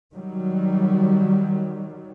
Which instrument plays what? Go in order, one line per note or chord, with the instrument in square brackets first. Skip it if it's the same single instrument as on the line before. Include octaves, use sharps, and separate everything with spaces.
[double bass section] D#3 F#3 G3